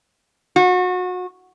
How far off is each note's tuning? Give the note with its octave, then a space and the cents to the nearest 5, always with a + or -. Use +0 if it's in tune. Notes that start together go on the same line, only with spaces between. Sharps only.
F#4 -30